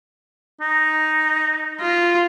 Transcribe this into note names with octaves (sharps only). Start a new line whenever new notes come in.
D#4
F4